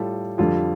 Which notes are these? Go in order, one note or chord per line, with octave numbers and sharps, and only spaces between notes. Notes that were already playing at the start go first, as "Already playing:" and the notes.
Already playing: A2 G3 F4 A4
F2 D3 G3 F4 A4